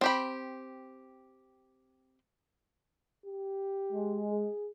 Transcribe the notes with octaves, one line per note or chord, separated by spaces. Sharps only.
C4 G4 B5
G4
G#3
G#4